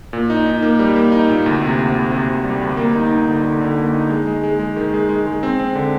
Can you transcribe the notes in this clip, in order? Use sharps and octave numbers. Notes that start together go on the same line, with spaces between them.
A#2
D#4
D#4
A#3
G3
A#3
D#4
A#2
D2
C3
D2
D2
C3
D2
G3
D2
A#3
D#4
D#4
D3
D3
D3
A#3
D#4
G#3
G#3
G#3
G#3
D#3
G#3
G#3
G#3
C4
C4
D3